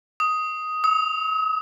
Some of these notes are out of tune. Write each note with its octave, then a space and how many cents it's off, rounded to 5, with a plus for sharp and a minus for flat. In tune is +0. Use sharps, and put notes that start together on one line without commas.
D#6 +5
D#6 +45